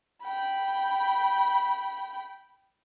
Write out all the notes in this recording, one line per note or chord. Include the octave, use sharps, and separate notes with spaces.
G5 B5